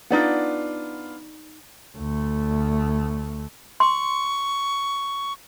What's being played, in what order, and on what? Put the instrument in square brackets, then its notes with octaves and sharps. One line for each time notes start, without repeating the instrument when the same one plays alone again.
[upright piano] B3 D4 F4 [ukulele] D#4 D5 F#5
[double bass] D2 A3
[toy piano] C6 [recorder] C#6